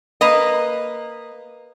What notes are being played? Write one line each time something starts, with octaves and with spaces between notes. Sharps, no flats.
A#3 B4 D#5